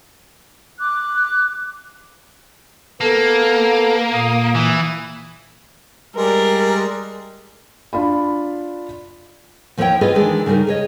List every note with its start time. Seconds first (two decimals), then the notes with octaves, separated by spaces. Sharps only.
0.80 D6 F#6
3.01 A#3 B3 A4
4.13 A#2 D#6
4.55 E3
6.16 G3 G#3 A#4
7.93 D4 F4 B5
9.77 D#2 F3 E4 C5 C#5 G5
10.01 F4 G#4 B4 C#5 D#5
10.15 D#3 E3 G#3 D4
10.46 C#3 G3 D#4 G#4 A#4
10.67 G#4 C#5 D#5